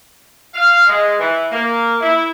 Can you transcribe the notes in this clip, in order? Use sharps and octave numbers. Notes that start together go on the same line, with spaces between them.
F5
G#3
E3
A#3
E4